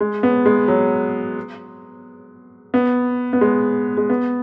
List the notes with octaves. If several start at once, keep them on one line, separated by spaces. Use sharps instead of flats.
G#3
B3
G#3
F#3
B3
B3
G#3
G#3
B3